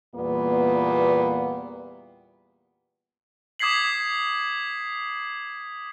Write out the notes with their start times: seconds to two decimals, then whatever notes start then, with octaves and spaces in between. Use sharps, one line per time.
0.14 E2 A#2 G3 A#3 B3
3.59 D6 D#6 G#6 B6 C7 F#7